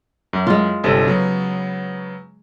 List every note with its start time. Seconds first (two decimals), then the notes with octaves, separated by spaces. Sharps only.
0.33 F#2
0.47 G#3 F4
0.84 G1 C3 A4
1.05 C#3 F#3 B3